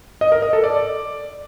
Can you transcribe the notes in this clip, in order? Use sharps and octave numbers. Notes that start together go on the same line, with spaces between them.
D#5
A#4
D#5
A4
D5